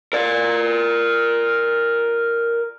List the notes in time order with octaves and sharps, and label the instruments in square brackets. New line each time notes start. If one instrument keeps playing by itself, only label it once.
[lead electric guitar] A#4 D5